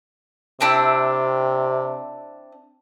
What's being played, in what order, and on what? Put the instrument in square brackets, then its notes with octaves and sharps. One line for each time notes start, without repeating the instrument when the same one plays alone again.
[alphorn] C3 [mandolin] C4 D4 E4